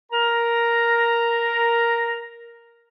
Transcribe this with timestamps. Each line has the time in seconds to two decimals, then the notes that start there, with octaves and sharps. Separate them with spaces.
0.12 A#4 A#5